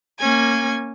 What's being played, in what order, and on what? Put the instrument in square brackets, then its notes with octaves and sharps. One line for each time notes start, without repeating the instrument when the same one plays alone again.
[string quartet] A#3 C#4 G#5 G#6